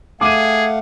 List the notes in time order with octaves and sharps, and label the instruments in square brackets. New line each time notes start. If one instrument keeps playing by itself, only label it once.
[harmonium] A3 F5 F#5 [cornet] G#4 [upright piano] D6 D#7